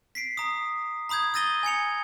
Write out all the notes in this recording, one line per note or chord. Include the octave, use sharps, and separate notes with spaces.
B6 C7 D7
A#5 D#6
A#5 B5 D#6 G6 G#6
D#6 E6 A6 A#6 D#7 G7
G#5 G#6 C#7 F7